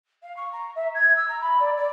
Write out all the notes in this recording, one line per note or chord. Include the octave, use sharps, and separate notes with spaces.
F5
C#6
A#5
E5
G#6
E6
A#5
B5
D5
D5